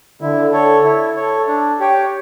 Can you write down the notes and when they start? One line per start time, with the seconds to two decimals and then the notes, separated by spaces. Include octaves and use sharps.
0.21 D3 E4
0.52 A4 C#5
0.84 E4
1.16 A4 C#5
1.47 D4
1.80 G4 C#5 G5